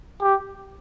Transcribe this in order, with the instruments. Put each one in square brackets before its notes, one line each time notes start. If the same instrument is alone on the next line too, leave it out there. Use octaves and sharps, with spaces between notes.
[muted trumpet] G4